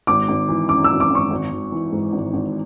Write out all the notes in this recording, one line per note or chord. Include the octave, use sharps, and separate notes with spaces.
G#1 D6
G#1
E3
F#2 D6
E6
G#1
D6
G#1 C#6
G#1
G#1
E3
G#2
G#1
G#1